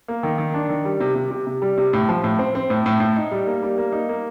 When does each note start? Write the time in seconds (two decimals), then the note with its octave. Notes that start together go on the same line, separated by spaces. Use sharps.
0.08 A#3
0.23 D#3
0.38 D#3
0.54 D4
0.69 D#3
0.85 G3
1.00 C3
1.15 C3
1.31 C3
1.47 C3
1.62 G3
1.77 C3
1.93 A2
2.09 F3
2.24 A2
2.39 C4
2.55 C4
2.70 A2
2.86 A2
3.00 A2
3.16 D#4
3.31 G3
3.47 A#3
3.63 G3
3.78 A#3
3.92 D#4
4.09 A#3